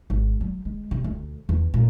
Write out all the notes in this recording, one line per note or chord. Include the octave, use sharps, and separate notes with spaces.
G#1
F#3
G#3
C3
D2
E2
A#2